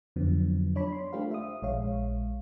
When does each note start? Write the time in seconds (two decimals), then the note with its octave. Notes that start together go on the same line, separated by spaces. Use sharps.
0.16 F2 D3 F3 F#3 B3
0.76 D4 C#5 D5 B5
0.92 C6
1.13 A3 D4 F4 G4 C5 F5
1.31 E5 D#6
1.62 A#1 G#3 C#5 F5